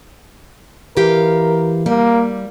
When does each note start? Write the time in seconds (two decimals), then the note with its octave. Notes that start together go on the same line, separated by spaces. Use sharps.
0.97 E3 G4 A#4 F5
1.86 G3 A#3